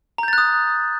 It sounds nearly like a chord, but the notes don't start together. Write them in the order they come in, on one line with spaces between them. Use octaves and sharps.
A#5 G6 A6 F#6 D#6